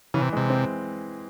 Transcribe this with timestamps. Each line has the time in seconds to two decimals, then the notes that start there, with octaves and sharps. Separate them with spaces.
0.14 C#3 E3
0.22 C3
0.33 C3 G#3
0.50 C4